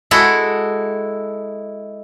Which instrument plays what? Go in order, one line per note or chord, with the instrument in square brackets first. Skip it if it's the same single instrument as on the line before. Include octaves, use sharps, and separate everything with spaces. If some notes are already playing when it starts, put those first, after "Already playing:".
[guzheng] G#3 E4 F#4 A4